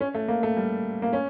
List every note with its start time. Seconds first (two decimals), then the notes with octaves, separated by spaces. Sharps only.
0.01 C#4
0.14 A3
0.28 A#3
0.43 A3
0.57 G3
1.02 A#3
1.13 C#4